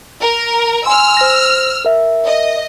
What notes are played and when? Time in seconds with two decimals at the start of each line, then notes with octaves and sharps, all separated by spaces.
0.22 A#4
0.86 G#5 C6 E6 F6
1.17 C5 A#6
1.85 A#4 E5
2.25 D#5